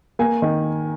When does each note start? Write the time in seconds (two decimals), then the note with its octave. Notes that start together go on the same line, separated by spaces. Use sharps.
0.19 A#3 G#5
0.42 D#3